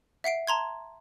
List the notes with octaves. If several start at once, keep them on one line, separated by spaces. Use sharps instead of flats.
E5 F#5 C7 D7
A5 A#5 C6 G#6